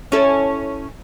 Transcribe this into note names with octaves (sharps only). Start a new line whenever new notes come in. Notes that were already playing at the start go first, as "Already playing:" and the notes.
C#4 E4 A4